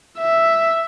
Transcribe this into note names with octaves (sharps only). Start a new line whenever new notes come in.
E5